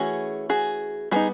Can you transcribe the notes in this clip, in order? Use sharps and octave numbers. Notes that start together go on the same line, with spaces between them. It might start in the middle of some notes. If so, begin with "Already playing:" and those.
Already playing: E3 A3 C#4 F#4 G#4
F#4 G#4
G3 B3 D#4 F#4 G#4